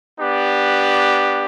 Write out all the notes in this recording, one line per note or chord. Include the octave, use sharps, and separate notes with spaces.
B3 D4 G4